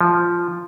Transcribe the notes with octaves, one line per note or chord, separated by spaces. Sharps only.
F3